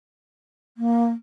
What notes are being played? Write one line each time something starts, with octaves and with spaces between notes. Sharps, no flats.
A#3